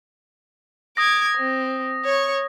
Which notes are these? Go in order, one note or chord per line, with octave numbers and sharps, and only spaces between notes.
D6 D#6 G#6 A#6
C4
C#5 C#6